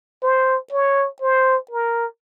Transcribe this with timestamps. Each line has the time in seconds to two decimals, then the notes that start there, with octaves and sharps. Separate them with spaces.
0.23 C5
0.73 C#5
1.22 C5
1.71 A#4